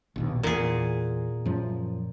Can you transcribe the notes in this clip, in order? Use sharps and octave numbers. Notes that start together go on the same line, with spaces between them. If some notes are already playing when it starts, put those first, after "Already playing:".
A#1 D#2 B2
E2 A#2 G#4
F#2 F3